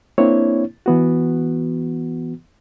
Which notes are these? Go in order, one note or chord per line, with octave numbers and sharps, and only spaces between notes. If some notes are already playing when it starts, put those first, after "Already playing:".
A#3 C4 D4 E4 C#5
E3 B3 F#4